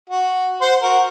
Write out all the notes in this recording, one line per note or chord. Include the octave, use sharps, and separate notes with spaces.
F#4
C5 F#5 C6
F#4 A#4